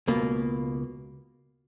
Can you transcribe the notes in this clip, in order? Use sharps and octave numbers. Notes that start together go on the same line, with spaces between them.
C#2 B2 A#3